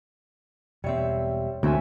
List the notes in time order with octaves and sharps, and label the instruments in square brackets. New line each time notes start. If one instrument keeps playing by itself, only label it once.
[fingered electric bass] E1 E2 [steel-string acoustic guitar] G3 E5 [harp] C4 C#5
[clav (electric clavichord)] D2 [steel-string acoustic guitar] D#3 C4 [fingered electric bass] A3 [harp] F#4 E5 G#5